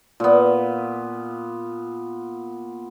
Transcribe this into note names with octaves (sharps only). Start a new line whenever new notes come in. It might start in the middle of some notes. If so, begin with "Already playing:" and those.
A#2 B3